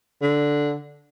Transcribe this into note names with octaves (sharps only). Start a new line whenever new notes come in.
D3